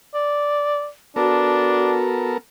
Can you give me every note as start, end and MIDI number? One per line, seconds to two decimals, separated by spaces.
0.14 0.88 74
1.16 2.38 59
1.16 1.97 62
1.16 2.31 66
1.16 2.38 69
1.16 2.38 70